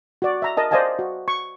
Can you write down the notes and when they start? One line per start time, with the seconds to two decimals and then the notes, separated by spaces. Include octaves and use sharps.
0.22 F#4 D5
0.42 E5 A#5
0.57 A#4 D#5 A5
0.71 C5 D5 D#5 F5 G#5 A5
0.99 F#4
1.28 C#6